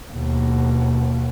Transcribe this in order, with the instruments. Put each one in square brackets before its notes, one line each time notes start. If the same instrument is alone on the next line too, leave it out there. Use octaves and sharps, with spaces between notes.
[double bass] D#2 B2